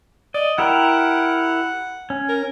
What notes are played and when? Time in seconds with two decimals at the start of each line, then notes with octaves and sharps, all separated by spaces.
0.34 D5 D#5
0.58 E4 G4 A#4 F#5
2.10 C#4
2.29 A#4